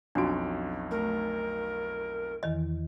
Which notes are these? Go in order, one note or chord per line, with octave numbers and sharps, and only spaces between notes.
B1 F2 D4 F#4 D7
A3 A#4
E2 D#3 E3 D#5